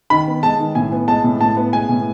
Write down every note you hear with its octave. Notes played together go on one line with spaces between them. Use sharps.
D#3 B5
B3
G#3 A5
D#3
A2 G#5
B3
G#3 A5
A2
A2 A5
B3
G#3 G#5
A2